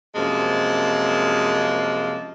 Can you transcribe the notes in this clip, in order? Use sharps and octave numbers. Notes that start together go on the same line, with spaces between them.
F#2 C3 F3 G#3 A#3 A5